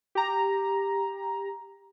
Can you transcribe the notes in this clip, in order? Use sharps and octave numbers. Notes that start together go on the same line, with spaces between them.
G4 A#5